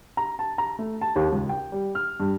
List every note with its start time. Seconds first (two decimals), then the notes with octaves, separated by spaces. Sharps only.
0.17 A#5
0.39 A5
0.58 A#5
0.79 A3
1.01 A5
1.16 D#2
1.33 C#2
1.49 G5
1.72 G3
1.95 F6
2.20 G2